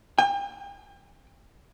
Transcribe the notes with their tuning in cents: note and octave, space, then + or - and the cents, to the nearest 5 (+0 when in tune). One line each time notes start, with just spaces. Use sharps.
G5 +40